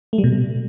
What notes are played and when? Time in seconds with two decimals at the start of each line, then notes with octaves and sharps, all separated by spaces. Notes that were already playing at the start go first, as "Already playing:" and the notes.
0.13 A3
0.18 G3
0.24 B2